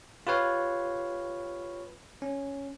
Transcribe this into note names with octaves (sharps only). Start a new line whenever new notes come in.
F4 G4 B4 C#5 F5
C#4